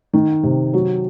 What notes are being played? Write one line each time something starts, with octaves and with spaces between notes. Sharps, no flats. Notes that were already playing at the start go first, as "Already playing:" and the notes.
D#3
C3
F#3